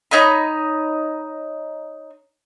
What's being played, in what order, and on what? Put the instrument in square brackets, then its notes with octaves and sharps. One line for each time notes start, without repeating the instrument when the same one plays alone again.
[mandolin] D#4 C#5 D#5 B5